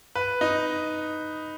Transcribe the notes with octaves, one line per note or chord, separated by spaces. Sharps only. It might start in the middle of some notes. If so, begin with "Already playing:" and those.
B4
D#4